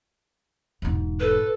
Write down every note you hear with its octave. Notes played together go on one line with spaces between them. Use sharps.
E1 G#2
A4 B4